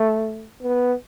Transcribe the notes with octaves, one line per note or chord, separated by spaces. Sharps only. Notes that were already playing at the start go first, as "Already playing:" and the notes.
Already playing: A3
B3